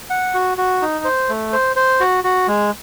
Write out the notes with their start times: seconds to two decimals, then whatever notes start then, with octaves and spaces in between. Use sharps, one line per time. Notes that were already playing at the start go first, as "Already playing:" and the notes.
0.10 F#5
0.34 F#4
0.58 F#4
0.82 D#4
1.05 C5
1.29 A3
1.53 C5
1.76 C5
2.00 F#4
2.24 F#4
2.48 G#3